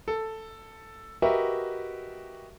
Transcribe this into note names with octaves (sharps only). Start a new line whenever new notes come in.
A4
F#4 G4 A#4 B4 D#5 E5